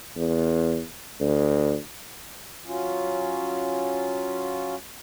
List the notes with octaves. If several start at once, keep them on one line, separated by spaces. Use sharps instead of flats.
E2
D2
F#3 C#4 F4